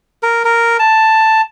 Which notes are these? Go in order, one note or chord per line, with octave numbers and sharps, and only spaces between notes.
A#4
A#4
A5